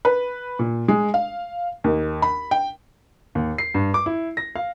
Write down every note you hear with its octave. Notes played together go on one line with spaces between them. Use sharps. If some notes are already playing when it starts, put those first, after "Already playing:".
B4
A#2
G#3
F5
D#2
B5
G5
D#2
C7
G2
D6
E4
A#6
F5